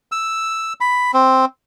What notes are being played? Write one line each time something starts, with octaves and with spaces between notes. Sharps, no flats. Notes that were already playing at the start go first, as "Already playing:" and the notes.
E6
B5
C4